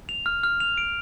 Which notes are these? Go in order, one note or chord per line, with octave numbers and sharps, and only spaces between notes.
F7
F6
F6
F7
D7